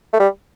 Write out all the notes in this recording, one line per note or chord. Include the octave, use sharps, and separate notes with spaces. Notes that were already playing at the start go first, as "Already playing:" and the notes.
A3
G3